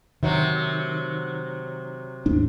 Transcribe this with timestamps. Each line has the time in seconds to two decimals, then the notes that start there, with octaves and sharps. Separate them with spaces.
0.23 C3 D#3 F#3
2.26 D#2 G#2 D4